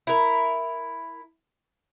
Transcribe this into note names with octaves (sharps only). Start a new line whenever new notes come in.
E4 A#4